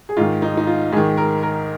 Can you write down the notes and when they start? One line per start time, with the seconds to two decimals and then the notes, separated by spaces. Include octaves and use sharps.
0.09 G#4
0.17 G#2 D#3 F4
0.42 D#4
0.57 D#4
0.67 F4
0.92 G#2 G#4
0.97 D#3
1.17 A#4
1.43 A#4